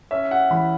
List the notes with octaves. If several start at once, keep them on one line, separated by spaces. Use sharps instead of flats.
C#4 E5
F#5
E3 B5